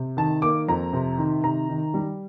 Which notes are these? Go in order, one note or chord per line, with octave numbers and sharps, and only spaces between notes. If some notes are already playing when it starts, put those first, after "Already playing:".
Already playing: C3
D#3 A5
A#3 D6
F2 A#5
C3
D#3
C3 A#5
D#3
G3